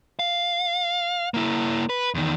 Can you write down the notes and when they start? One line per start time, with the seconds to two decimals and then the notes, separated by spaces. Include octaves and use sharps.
0.19 F5
1.34 A#3 E4
1.89 B4
2.15 E2 D#3